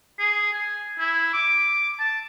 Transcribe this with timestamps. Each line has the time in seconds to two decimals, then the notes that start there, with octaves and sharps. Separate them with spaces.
0.19 G#4
0.53 G#5
0.99 E4
1.33 D6
2.00 A5